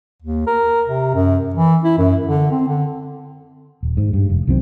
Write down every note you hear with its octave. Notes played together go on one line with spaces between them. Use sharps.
D#2
A#4
C3
F#2
E3
E4
F#2
D3
C4
D3
D#1
G#2
G2
F1
C2 D#3 F#3 C4